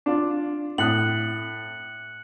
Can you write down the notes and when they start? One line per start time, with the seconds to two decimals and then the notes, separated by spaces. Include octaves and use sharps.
0.06 D4 F4
0.78 A2 D#6 F#6 C#7 F#7